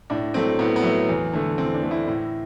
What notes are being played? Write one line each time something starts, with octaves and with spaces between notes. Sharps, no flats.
A2 D4
F#3 A3 C4
A2 B3
B3
F#3 A3
E2
D3 A3
E2 C4
D4
D3 A3
E4
A2